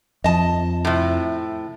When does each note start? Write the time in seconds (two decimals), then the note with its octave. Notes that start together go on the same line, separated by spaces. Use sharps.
0.24 F2 F3 D#5 A5
0.85 A2 C3